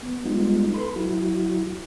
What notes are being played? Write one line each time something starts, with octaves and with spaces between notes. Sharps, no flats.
B3
G3 G#3 B3 D#4 F4
A4 B4 B5 C6
F#3 E4 F#4